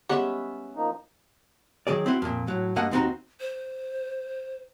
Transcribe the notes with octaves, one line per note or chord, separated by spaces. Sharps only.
G3 G#3 B3 C#4 E5 F#5
F3 A#3 D#4
D#3 F#3 G#4 D5
C4 E4 F#4
F2 A#2
A2 F#3
G2 A3 A#3 D#5 F#5
D#2 F3 C4 D#4 F#4 A#5
C5